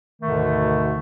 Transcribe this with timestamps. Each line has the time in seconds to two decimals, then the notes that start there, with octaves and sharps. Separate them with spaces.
0.22 D2 G#2 B2 D3 D#3 A3